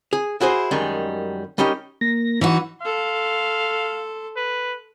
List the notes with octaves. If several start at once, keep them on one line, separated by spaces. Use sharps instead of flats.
G#4
E4 F#4 G#4 C5
F#2 D#3 G3 G#3
G3 C#4 D#4 G4 A#4
A#3 A#6
E3 D#4 F#4
A4 F5 C6
B4